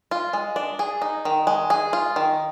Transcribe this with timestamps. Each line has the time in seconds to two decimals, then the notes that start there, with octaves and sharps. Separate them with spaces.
0.11 F4
0.33 G#3
0.56 D4
0.79 G#4
1.02 D#4
1.25 D#3
1.47 G#3
1.70 G#4
1.93 F4
2.16 D#3